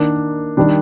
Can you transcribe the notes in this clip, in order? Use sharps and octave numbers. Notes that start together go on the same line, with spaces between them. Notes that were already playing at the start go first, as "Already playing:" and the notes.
Already playing: D#3 A#3 D4
D#3 G3 D4